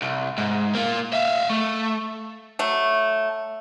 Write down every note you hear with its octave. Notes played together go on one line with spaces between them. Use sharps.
C2
G#2
A#3 F4
E5 F5
A3
F#3 A3